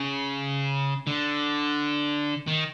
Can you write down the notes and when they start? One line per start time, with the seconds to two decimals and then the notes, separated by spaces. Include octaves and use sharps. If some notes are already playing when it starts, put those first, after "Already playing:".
Already playing: C#3
1.07 D3
2.47 D#3